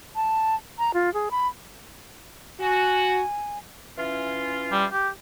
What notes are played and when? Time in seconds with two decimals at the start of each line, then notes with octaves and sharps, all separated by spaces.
0.16 A5
0.79 A#5
0.94 F4
1.14 G#4
1.31 B5
2.60 F#4 G#5
3.98 E3 C#4 F4
4.72 G3
4.93 G4